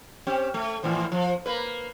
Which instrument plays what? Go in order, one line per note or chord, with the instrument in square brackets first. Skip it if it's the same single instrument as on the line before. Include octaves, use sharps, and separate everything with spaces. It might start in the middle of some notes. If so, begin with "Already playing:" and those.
[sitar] C4 C#4 G4
A3
A2 E3 F3
F3
A#3 B4